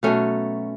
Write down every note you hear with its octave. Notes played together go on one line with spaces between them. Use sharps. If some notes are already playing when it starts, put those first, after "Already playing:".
B2 F#3 A3 C#4